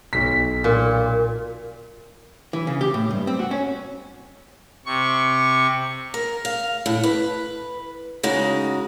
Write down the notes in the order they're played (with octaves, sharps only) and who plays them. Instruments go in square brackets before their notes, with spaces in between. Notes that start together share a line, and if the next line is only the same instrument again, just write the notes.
[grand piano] B1 B6
[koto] A#2
[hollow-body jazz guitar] E3
C#3
G4
A2
G2
C4
F#4
C#4
[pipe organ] C3 C#6
[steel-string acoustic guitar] A#4
F5
A2
B4
C#3 G#3 D#4 F#4